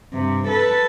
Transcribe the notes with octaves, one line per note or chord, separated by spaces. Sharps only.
G2 C3
A4 B4